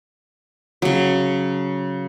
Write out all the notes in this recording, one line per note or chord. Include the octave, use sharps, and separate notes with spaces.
C#3 F#3